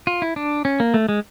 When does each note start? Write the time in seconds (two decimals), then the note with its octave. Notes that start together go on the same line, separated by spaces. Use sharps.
0.07 F4
0.22 E4
0.36 D4
0.65 C#4
0.80 A#3
0.94 A3
1.09 G#3